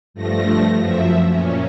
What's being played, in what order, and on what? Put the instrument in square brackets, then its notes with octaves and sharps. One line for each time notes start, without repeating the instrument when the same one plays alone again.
[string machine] G2 F3 A3 A#6
F#2 F3 E5
A#2 C#4